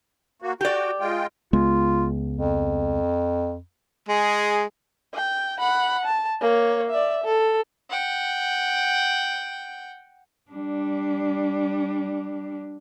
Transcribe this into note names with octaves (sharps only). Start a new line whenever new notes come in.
A#3 F#4
F#4 G4 D5 G5
G#3 F4 G5
C#2 G#3 B3 F4
F2
G#3 G#4
G5
F#5 B5
A5
A#3 C#5
D5 E5
A4
F#5 G5
G3 D4